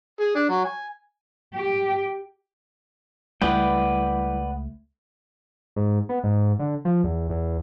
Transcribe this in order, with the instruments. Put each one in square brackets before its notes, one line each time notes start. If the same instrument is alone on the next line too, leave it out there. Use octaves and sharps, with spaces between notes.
[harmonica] G#4
D4
F#3
G#5
[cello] G4 G5
[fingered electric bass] C#2 A3 [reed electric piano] G3 E4 [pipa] B3 [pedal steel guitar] B4 D5 G5
[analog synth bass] G#2
B3
G#2
D3
F3
E2
E2